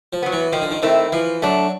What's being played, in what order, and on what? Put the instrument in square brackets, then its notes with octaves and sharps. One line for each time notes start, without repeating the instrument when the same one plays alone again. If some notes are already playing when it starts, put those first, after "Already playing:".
[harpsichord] F3
[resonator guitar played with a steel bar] F#3 B3
[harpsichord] E3
[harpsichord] D#3 [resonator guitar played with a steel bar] F3
[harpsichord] D3
D#3
[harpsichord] D#3 [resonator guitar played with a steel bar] A3 C4 E4
[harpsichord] E3 [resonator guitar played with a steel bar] F3
[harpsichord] F#3 [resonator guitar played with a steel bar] A3 D4